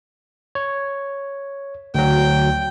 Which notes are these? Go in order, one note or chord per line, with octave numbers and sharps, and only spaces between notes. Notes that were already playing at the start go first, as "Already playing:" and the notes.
C#5
D2 F#3 G5